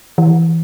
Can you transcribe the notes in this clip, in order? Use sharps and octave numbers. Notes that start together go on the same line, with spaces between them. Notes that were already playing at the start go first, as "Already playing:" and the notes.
E3